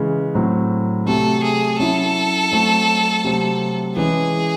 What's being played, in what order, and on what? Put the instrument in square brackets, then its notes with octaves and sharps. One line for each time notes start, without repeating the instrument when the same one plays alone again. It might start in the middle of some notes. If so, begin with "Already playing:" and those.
Already playing: [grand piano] C#3 E3 G#3
A2 F#3 C4
[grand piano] C3 F#3 A3 [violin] A4
[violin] G#4
[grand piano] F#3 C#4 E4 [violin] A4
[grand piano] F#3 A3 C4
C3 F#3 A3 C4
[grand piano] E3 G#3 C#4 [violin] G#4